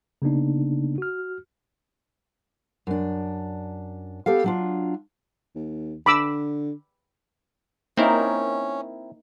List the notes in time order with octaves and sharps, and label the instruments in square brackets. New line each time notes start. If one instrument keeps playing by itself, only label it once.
[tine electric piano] C#3 A#3 B3 D4 D#4
F#4 F6
[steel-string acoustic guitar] F#2 D4
B3 G4 A4 F5
F#3 D4 F4
[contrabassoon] D#2
[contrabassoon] D3 [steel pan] B5 D6 E6
[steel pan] A#3 D#4 [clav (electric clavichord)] C4 E4 A#4 [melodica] C#4